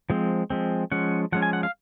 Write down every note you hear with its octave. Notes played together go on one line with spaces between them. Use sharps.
F3 G#3 C4
F3 G#3 C4
F3 G#3 C#4 F#5
F3 G#3 C#4 F#5
G#5
F#5
F5